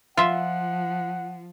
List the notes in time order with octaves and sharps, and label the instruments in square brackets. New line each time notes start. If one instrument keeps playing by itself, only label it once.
[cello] F3 [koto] F4 E5 [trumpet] F#5